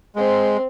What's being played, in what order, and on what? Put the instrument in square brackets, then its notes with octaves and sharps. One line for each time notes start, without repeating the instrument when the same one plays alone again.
[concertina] G#3 [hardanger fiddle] C4